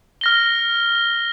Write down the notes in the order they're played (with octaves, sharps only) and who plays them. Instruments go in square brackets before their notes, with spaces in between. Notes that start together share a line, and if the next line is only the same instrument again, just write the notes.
[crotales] F6 A#6 G7